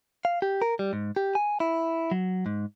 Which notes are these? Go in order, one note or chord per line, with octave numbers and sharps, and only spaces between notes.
F5
G4
A#4
G3
G#2
G4
G#5
E4
F#3
G#2